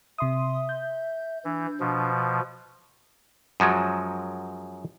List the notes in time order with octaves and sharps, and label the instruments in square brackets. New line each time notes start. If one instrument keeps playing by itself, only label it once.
[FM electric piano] C3 C6 D#6 [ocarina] E5
[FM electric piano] G6
[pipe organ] E3 [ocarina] D4
[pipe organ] B2 F3
[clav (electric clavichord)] F#2 F3 F#3 G#3